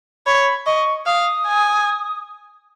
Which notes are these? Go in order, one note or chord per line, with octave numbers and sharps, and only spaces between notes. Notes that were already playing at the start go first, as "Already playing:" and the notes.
C#5 B5
D#5 C#6
F5 D#6
G#5